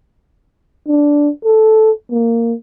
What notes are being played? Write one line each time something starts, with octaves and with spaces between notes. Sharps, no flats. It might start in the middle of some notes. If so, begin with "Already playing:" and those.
D4
A4
A#3